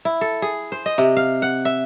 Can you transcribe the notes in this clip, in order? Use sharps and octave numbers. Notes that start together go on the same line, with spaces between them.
E4
A4
G#4
C5
D#5
C3
F5
F#5
E5